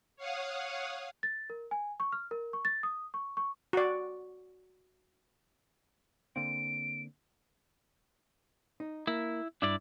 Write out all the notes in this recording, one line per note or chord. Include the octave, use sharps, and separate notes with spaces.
C#5 F5 F#5 D#6
A6
A#4
G#5
C#6
F6
A#4
C#6
A6
D#6
C#6
C#6
F#4 D5
D3 A#3 C4 D7
D#4
A#3 E4
G2 D4 E4 D5